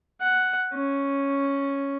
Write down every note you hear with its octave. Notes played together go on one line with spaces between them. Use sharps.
F#5
C#4